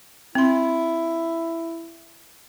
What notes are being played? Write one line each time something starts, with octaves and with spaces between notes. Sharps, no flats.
C4 E4 C6